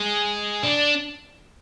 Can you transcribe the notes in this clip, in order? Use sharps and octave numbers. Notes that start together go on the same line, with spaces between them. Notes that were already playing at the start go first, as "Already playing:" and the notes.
Already playing: G#3
D4